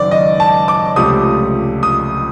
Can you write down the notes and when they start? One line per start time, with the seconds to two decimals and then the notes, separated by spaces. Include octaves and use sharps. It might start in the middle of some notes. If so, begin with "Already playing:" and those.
Already playing: F#1 F#2 D#3 D5
0.11 D#5
0.40 A5
0.68 D6
0.96 C#2 C3 F3 A3 D#6
1.83 D#6